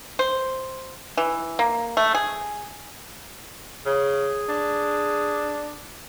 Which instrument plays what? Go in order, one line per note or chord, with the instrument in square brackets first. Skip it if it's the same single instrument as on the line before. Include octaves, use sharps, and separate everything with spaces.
[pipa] C5
E3
A#3
A3
G#4
[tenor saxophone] C#3 [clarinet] G#4
[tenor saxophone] D4